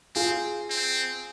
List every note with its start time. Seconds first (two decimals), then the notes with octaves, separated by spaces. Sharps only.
0.15 C4 F4 G#4
0.70 C4